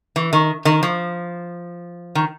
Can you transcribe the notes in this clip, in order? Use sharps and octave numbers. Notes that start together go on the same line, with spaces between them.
E3
D#3
D#3
F3
D#3